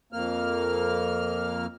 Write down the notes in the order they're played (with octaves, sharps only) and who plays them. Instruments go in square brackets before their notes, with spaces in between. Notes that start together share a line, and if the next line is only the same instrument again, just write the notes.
[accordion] F2 A#3 F6